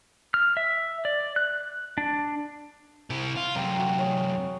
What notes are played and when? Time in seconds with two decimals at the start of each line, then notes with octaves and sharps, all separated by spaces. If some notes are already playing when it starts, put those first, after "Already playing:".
0.34 F6
0.57 E5
1.05 D5
1.36 F#6
1.98 D4
3.10 C3 E4
3.36 F4
3.56 F#2 C3 F5 G5 A#5
3.79 F#4
3.99 G#4 C#5